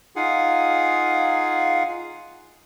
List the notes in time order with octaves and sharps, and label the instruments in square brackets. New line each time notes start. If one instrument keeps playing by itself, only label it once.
[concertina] D#4 F4 G#4 F5 F#5 G#5